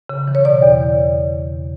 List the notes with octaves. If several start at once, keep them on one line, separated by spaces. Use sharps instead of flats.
C#3
E3
C#5
B2 D5
E2